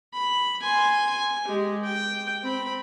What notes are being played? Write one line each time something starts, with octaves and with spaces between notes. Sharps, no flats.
B5
G#5 C6
G#5
G#3 G4
G5
C4 B5